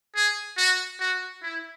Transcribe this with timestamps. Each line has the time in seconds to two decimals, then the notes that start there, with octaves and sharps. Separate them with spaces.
0.15 G#4
0.57 F#4
1.00 F#4
1.43 E4